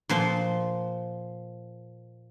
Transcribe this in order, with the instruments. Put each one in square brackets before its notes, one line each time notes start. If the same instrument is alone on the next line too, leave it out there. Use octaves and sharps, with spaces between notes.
[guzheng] A#2 F3 C5